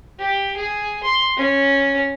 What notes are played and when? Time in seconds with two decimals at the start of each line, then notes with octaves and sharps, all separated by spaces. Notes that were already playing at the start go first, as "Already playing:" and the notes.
0.19 G4
0.57 G#4
1.03 C6
1.37 C#4